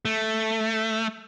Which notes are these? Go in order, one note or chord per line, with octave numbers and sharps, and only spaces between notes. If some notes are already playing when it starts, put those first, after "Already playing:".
A3